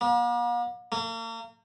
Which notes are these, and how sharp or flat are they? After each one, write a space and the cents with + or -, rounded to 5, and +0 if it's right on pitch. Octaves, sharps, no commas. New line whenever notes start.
A#3 +45
A#3 -40